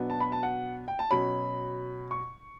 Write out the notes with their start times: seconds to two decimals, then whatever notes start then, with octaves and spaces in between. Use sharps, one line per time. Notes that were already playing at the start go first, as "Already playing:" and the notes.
Already playing: B2 F#3 B3 D4
0.10 A5
0.20 B5
0.32 A5
0.43 F#5
0.88 G5
0.99 A5
1.11 B2 F#3 C#4 B5
2.11 C#6